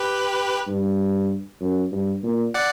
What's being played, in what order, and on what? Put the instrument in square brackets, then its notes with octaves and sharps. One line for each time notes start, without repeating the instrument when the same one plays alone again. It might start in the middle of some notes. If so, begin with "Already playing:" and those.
Already playing: [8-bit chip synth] G4 B4
[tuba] G2
F#2
G2
A#2
[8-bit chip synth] D5 F#5